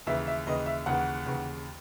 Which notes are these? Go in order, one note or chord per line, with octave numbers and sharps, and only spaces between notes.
D#2 C#3 E3 E5
E5
D#2 C#3 E3 D#5
E5
D#2 C#3 E3 F#5
D#2 C#3 E3